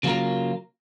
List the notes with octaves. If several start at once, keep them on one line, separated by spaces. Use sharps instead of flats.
C#3 F#3 A#3 F4 A#4